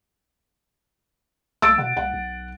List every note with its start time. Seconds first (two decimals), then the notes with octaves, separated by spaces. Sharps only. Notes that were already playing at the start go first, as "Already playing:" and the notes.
1.62 C2 E6 A6 D7
1.78 B2 F#5
1.97 C2 F#5
2.14 B1